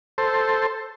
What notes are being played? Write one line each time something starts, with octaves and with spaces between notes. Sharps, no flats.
A4 C5